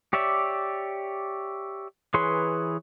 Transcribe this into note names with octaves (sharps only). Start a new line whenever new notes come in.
G4 C#5 D5 E5
E3 G#4 B4 C#5 C6